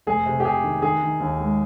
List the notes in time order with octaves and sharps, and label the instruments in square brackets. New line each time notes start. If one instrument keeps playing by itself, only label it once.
[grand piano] F1 G#4
C3
G4
C3 G#4
D#3
D#3 G#4
D#3
D#2
G#3